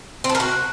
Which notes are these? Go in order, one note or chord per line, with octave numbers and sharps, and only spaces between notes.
C4
A4
A#4
F#4